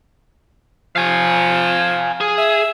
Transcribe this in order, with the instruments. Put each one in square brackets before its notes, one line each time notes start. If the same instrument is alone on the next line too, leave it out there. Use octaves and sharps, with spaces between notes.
[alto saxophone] F3 [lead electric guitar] F5 G#5
[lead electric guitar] G#4
[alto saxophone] E5